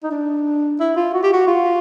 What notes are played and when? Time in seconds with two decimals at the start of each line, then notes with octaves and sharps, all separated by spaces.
0.04 D#4
0.11 D4
0.80 E4
0.97 F4
1.13 F#4
1.23 G4
1.33 F#4
1.47 F4